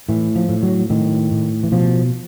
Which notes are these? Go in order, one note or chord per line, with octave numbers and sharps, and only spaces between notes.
A2 E3
F3
A2
F#3
A2 D#3
A2
E3
B2 F3